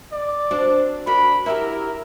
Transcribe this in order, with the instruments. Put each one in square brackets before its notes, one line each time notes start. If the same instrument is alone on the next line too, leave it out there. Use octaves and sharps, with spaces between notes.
[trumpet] D5
[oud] C4 D4 F#4
[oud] D4 F#4 A#4 [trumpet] B5
[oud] E4 F#4 G4 [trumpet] A#4